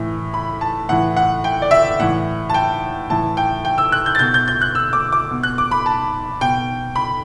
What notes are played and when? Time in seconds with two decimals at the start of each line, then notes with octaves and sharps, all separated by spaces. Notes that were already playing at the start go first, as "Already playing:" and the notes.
Already playing: A2 E3
0.34 B5
0.61 A5
0.89 A2 E3 F#5
1.16 F#5
1.44 G5
1.62 D5
1.71 E5
2.00 A2 E3 F#5
2.50 A5
2.54 G5
3.10 A2 E3 A5
3.37 G5
3.65 G5
3.78 E6
3.92 F#6
4.06 G6
4.15 A6
4.19 B2 G6
4.34 G6
4.48 G6
4.61 F#6
4.75 E6
4.93 D6
5.12 D6
5.31 B2
5.43 F#6
5.58 D6
5.71 B5
5.86 A5
6.41 B2 G5
6.96 B5